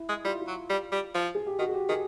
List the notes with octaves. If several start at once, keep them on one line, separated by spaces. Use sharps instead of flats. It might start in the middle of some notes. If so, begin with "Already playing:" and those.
Already playing: E4
G#3
G3 F4
E4
F4
F#3
G3
G3
F3
G#4
G4
D#3 F#4
G#4
G4
D#3 G#4